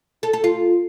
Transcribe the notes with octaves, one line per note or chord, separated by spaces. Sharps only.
A4
A4
F4